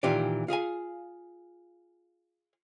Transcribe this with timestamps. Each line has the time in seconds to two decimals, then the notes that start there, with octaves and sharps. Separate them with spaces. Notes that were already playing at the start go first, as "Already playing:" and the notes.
0.03 A#2 D#3 E3 F4 G4 D5
0.48 F4 G#4 F5 G#5